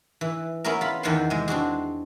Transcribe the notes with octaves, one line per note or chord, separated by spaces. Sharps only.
E3
B3 C#4 E4 G#4 A#4
F4 B5
E2 D#3 E5 F#5 G5 C6
C3 G#3
C4 D4 F#4 G#4